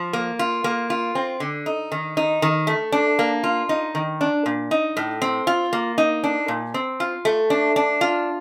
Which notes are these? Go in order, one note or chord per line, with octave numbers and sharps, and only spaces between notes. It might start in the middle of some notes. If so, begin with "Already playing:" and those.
Already playing: F3
A#3
F4
A#3
F4
C4
D3
D#4
D#3
D#4
D#3
A3
D4
A#3
F4
D#4
D#3
D4
A#2
D#4
A2
C4
F4
A#3
D#4
D4
A#2
C4
F4
A3
D4
D4
F4